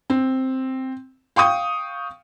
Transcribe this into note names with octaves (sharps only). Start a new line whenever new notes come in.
C4
F5 G5 C#6 D#6